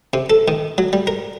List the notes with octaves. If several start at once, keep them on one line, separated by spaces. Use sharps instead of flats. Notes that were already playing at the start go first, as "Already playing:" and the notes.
C3
A4
D#3
F#3
G3
A#4